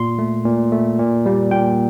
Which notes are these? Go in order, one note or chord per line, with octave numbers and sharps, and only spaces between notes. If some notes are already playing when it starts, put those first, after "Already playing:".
Already playing: A#2 C6
A3
A#2
A3
A#2
G3 A#3
A#2 G5